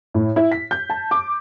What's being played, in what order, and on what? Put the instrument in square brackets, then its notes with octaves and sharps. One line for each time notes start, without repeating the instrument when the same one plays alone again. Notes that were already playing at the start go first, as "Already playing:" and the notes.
[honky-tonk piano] A2
E4
B6
G6
A5
D6